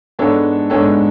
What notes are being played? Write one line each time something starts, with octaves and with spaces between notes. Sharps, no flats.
G#2 G#3 B3 D4 A4 C#5
G#2 G#3 B3 D4 A4 C#5